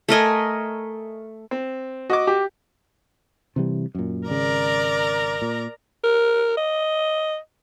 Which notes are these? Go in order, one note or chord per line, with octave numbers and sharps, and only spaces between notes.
A3 A#4 D#5 G#5
C4
F#4 D#5 D6
G4
C3 E3 G3
F#2 A#2
G#1 C#3 A#4 D5 A#5
A#2
A#4
D#5